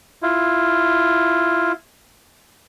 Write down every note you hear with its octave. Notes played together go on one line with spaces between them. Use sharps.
E4 F4